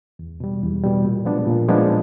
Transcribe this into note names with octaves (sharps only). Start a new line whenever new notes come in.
E2
B2 G3
E2
B2 G3
A#2
F3 G#3 B3 D4
A#2
F3 G#3 B3 D4